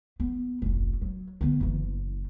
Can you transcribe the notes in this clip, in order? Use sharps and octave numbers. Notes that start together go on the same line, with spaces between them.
B3
F1 A#1
F#3
D3 B3
F#1 E3